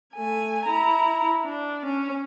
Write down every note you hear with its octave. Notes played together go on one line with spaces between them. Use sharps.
A3 G#5
E4 A#5
D4
C#4